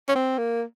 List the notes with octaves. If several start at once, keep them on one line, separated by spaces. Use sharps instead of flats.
C#4
C4
A#3